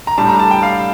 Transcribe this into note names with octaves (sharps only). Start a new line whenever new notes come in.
A#5
A2 G3 D4 A5
A#5
A5
G5
F5